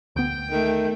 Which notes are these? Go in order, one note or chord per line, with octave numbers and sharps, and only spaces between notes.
D2 B3 G5 G6
D#3 A3